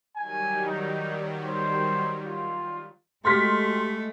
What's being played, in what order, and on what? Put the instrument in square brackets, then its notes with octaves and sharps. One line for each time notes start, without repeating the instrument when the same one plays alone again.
[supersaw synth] D#3 F#3 G3 [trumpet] G#5
[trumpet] D#4
C5
F4
[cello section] G#3 [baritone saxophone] A3 [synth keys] F#4 G4 A4 [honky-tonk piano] C6 F6 B6